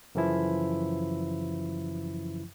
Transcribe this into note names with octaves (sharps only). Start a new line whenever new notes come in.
F#2 C#3 E3 F3 E4